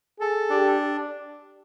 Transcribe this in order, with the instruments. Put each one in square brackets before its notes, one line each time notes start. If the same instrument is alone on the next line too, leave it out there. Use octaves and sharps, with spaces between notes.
[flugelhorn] G#4 [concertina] A4
[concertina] D4 [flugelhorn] G4